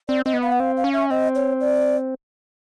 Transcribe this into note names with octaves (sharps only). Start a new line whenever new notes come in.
C4 D5
C4 D#5
B3
F5
F#5
C4 F5
F5
C#4
E5
C4 D#5
C#5
D5